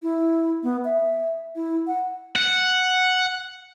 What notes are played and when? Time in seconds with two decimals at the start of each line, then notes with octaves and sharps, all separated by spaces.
0.03 E4
0.63 B3
0.85 E5
1.56 E4
1.87 F#5
2.36 F#5